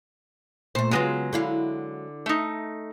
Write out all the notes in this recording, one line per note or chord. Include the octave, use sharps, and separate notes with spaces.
A#2 A3 C5
C#3 F#3 G#3 B3 F4
D3 E4 F5
A3 D#4